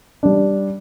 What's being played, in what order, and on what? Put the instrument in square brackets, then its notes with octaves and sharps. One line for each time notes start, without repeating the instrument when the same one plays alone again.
[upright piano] G3 D4